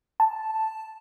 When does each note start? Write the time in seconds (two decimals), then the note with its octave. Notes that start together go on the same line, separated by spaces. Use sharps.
0.20 A5